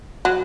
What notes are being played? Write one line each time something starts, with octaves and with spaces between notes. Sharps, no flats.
F#3